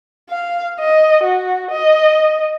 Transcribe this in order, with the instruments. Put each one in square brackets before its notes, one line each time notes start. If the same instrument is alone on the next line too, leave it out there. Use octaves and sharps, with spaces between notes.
[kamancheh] F5
D#5
F#4
D#5